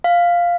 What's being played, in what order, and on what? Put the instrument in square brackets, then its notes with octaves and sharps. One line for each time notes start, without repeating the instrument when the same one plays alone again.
[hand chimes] F5